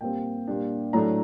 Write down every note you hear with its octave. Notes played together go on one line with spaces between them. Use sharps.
A#2 G3 C4 G5
A#2 G3 D4
A2 F#3 A3 D4 A#5